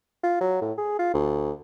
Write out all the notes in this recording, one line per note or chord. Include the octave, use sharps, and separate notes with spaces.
F4
F#3
A2
G#4
F4
D2